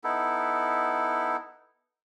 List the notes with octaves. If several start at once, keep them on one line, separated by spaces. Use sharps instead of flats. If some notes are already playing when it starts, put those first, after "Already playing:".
B3 D#4 E4 A4